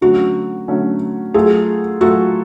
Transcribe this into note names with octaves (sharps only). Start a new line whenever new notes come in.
D3 F#3 A3 C#4 F#4
D3 F#3 A3 C#4
F#3 A3 F4 G#4 A4
F#3 A3 F4 F#4 A4